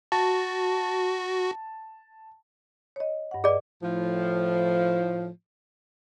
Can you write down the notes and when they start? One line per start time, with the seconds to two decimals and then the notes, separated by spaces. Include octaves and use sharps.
0.12 F#4 A5
2.96 C#5 D#5
3.31 G2 F#5
3.44 G#4 B4 D5 D#5
3.82 A2 F3